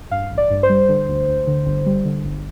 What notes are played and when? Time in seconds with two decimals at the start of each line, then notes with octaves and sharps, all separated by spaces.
0.11 G2 F5
0.31 A1
0.38 D5
0.50 G2
0.63 C5
0.69 G3
0.89 D3
1.08 D2
1.28 D2
1.47 D3
1.66 G1
1.86 G3
2.05 D3
2.24 G1